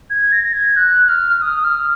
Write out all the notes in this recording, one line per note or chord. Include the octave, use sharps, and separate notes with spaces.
G#6
A#6
A#6
G#6
F#6
F6
D#6
F6